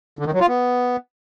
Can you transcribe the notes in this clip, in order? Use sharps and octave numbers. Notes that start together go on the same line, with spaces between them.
D3
D#3
F#3
F4
B3